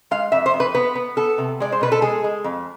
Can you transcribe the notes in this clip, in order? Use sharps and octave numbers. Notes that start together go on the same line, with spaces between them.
G#3 F5
F2 E5
C5
F2
B4
B3 B4
B3
B3 A4
C3
G#3 D5
C5
B2 B4
A4
G#3 G#4
G#3
F2